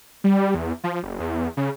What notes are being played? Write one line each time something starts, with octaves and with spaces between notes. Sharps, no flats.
G3
E2
F3
F#1
E2
C#3